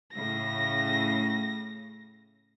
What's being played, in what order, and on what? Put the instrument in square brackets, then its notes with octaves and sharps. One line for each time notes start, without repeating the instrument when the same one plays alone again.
[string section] A2 C#3 [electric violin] A#6